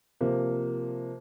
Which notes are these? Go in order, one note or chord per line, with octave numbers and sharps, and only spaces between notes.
C3 F3 A#3